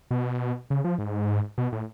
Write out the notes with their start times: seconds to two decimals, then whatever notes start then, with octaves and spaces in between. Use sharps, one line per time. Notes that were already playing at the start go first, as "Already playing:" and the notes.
0.11 B2
0.70 C#3
0.84 F3
0.99 G#2
1.58 B2
1.72 A2